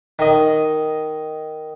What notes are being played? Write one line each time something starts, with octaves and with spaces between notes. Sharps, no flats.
D#3 D#5